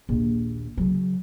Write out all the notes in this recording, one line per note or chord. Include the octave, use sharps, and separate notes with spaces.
A#1 D#2
C#3 F#3